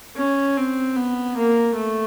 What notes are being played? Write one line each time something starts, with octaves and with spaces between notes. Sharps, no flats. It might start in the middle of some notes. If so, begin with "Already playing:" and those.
C#4
C4
B3
A#3
A3